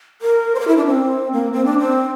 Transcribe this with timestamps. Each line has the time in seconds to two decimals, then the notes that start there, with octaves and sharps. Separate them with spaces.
0.22 A#4
0.55 C5
0.59 A#4
0.68 E4
0.77 D4
0.86 C4
1.33 A#3
1.53 C4
1.65 D4
1.79 C4